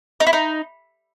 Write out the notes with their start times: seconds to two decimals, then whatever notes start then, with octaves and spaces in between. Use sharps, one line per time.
0.20 D#4
0.27 E4
0.33 D#4